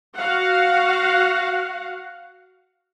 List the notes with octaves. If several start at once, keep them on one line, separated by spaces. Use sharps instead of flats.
F#4 F5 F#5